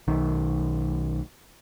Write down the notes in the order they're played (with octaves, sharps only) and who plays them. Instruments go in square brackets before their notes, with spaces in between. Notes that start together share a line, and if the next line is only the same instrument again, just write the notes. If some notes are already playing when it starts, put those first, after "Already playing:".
[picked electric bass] B1 D#3